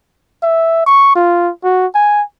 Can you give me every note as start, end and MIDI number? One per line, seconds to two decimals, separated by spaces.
0.43 0.86 76
0.86 1.16 85
1.16 1.50 65
1.64 1.87 66
1.95 2.22 80